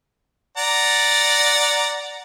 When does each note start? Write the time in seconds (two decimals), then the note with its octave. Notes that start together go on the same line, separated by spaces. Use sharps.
0.57 D5 F#5 A#5